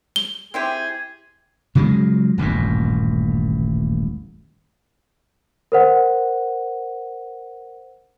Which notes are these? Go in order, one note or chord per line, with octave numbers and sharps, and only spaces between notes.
G7
C4 E4 G4 G#4
C#3 F3 F#3 G#3
D#1 A1 G2 A#2
A#4 C5 F#5